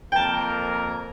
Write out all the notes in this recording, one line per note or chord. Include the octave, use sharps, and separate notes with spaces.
F2 A#3 A#4 G5 A5